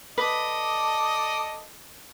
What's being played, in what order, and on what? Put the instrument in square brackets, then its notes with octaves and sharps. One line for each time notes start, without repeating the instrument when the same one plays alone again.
[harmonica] A4 D5 D#5 [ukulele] B4